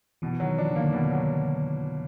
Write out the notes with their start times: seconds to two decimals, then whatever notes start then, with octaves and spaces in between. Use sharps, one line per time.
0.22 B2 E3
0.33 E3
0.40 D#3 F#3
0.58 F3 D4
0.71 D3
0.76 D#3 A#3
0.93 B2 D3
1.11 F#3